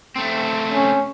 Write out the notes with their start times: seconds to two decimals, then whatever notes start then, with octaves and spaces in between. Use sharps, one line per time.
0.16 A3 C4
0.72 C#4